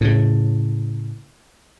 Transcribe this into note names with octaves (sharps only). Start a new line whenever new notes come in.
A2 C#3